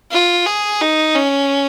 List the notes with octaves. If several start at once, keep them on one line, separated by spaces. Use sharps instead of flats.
F4
G#4
D#4
C#4